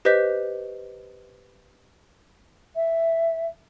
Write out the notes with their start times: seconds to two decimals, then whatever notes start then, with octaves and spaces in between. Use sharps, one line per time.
0.05 G4 B4 C5 D#5 G6 B6
2.76 E5